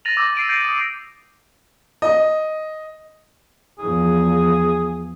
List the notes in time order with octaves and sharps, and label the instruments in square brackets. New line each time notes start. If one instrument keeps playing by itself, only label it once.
[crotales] A6 A#6 D#7 F7 F#7
D6 E6 G6 A#6
C7 D7 D#7
G6 A6 C#7 D#7
D#6
[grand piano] D#5
[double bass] E2 F3 [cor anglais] G#4